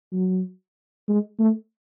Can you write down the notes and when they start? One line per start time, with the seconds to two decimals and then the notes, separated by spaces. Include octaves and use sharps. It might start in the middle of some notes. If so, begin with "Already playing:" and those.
0.13 F#3
1.08 G#3
1.40 A3